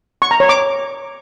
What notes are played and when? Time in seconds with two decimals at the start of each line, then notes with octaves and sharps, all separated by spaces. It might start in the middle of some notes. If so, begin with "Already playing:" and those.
0.22 C#6
0.31 A#5
0.40 C#5
0.49 D6